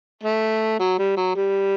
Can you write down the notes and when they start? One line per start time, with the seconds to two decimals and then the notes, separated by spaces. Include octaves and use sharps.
0.23 A3
0.79 F#3
0.98 G3
1.17 F#3
1.35 G3